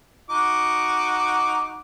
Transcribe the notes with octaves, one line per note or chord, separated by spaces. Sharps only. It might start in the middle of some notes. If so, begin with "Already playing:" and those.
D#4 F#4 D6